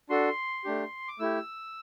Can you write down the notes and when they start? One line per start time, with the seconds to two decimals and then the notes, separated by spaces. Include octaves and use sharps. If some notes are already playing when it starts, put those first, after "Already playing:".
0.09 D4 F#4 A4 C6
0.64 A3 D4 G4
1.08 D6
1.19 A3 E4 G4 E6